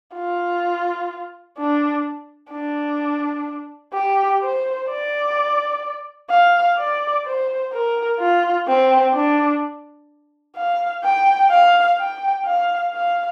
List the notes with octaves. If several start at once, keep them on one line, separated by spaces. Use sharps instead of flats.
F4
D4
D4
G4
C5
D5
F5
D5
C5
A#4
F4
C4
D4
F5
G5
F5
G5
F5
F5